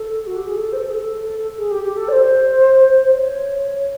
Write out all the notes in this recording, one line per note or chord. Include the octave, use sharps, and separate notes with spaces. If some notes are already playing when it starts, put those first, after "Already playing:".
Already playing: A4
F#4
G4
G#4
A4
C5
A4
G#4
A4
G#4
G4
G4
A4
D5
C5
C#5